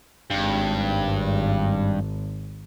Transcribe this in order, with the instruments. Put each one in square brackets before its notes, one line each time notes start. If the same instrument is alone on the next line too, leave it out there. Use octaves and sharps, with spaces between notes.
[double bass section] G#1 [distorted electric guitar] G2